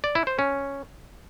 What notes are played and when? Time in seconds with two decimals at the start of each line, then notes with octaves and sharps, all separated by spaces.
0.04 D5
0.15 E4
0.27 C5
0.39 C#4